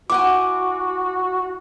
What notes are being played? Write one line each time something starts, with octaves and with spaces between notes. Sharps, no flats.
E4 F#4 F#5 G#5 D6